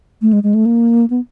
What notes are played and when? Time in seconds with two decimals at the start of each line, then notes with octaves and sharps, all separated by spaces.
0.22 A3
0.33 G#3
0.43 G#3
0.54 A3
0.66 A#3
1.10 B3